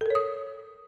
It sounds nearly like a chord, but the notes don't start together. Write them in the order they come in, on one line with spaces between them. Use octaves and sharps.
A4 A#4 C#5 D#6